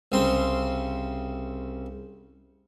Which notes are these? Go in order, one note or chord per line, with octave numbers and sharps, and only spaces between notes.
C2 C#3 C4 C6